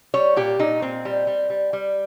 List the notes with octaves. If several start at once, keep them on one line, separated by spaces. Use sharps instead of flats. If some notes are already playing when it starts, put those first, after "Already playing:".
G3 C#5
A#2 G4
A#2 D#4
A#2 C4
G3
G3
G3
G3